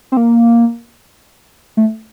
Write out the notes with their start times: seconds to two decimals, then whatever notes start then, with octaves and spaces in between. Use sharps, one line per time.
0.12 C4
0.17 A#3
1.77 A3